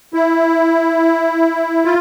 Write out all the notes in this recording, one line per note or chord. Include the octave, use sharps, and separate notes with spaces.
E4
F4